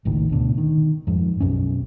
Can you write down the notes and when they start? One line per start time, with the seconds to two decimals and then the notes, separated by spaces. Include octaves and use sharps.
0.05 G#1 C#2 A2 D#3
0.29 D2 B2 D3
0.58 D#3
1.07 F2 G#2
1.40 B1 F#2 C#4